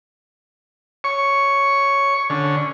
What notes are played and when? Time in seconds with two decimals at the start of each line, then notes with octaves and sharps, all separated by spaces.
1.04 C#5 C#6
2.30 D3 C#4